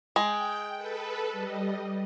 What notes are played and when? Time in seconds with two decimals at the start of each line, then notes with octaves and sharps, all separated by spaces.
0.16 G#3 G5
0.76 A4 B4
1.32 G3 D#5